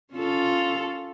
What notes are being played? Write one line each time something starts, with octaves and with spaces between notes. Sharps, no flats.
C#4 F4 A4